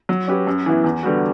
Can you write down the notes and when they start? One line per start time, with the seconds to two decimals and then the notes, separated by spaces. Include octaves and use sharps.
0.09 F#3
0.28 C#4 G4 B4
0.47 F#2
0.66 E3 B3 E4
0.84 E2
1.03 D3 G3 B3 F#4